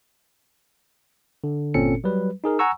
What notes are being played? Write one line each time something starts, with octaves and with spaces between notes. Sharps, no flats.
D3
G1 A#2 C4 C#4 A4 C#7
F#3 G3 B4
D#4 G#4 A#4
F#5 G#5 A#5 C#6 E6